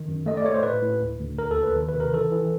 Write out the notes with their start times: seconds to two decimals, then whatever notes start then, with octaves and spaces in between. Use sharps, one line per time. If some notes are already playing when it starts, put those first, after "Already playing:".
Already playing: D#3
0.08 F#2
0.26 A3 D#5
0.37 D5
0.45 A3 C#5
0.54 C5
0.63 A2 B4
0.82 A2
1.01 D2
1.20 D2
1.38 D#2 A#4
1.51 A4
1.57 D#2
1.63 B4
1.76 D#3
1.89 B4
1.94 C3
2.00 A#4
2.13 E3 A4
2.32 E3